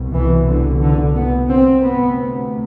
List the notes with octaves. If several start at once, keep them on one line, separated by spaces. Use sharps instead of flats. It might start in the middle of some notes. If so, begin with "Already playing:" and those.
Already playing: C2 B2
E3
D3
D3
B3
C4
D2 C3 B3